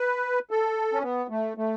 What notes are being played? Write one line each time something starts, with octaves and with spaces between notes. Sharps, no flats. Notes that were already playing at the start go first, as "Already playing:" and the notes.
Already playing: B4
A4
C#4
B3
A3
A3